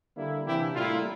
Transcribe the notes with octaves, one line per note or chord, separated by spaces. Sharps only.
D3 G3 A#3 E4
C3 E3 A#3 D4 E4 G4
A2 G3 A#3 E4 F4